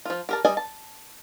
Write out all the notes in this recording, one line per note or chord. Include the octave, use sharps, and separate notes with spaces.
F3 F4
G4 A#4 A5
G3 D5 D#5 G#5
A5